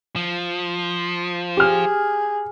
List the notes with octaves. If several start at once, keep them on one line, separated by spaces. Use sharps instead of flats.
F3
G4 G#4 F6